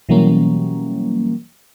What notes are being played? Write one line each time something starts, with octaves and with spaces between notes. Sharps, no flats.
B2 E3 F#3 G3 A#3 C#4